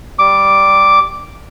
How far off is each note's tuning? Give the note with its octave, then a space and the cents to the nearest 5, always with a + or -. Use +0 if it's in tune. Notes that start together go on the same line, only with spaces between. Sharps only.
G3 +0 D6 +0